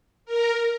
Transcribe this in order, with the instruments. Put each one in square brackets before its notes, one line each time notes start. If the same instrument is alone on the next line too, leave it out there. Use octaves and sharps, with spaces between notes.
[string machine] A#4